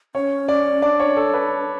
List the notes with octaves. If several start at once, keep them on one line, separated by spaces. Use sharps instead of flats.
C#4 C#5
D5
D4 D5
C#5
A4
B4